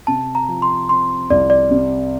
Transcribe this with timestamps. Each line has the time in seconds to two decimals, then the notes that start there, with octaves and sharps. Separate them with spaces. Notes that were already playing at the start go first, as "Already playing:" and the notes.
0.07 C3 A5
0.35 A#5
0.49 F3
0.62 C6
0.89 C4 C6
1.30 C2 D5
1.50 D5
1.71 C3